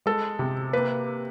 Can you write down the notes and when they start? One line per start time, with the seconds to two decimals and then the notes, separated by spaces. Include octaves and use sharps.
0.06 G#3 A4
0.39 C3
0.73 A#3 B4